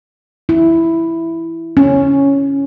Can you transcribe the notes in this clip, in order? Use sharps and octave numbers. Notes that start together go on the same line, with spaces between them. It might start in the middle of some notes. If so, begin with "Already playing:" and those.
E4
C#4